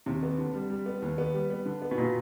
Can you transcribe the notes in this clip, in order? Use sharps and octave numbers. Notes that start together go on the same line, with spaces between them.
D#2 C3
B3
D3
G3
G3
B3
D#2
B3
G3
B3
D3
B3
B2
A#2